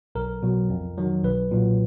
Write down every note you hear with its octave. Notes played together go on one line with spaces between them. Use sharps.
B1 A#4
B2 F#3
F2
D#3 F#3
B1 B4
A#2 F#3